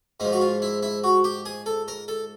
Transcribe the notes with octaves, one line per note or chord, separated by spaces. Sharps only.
G#2 F3 D#4
F#4
F4
E4
E4
F#4
G4
G#4
A4
A#4
A4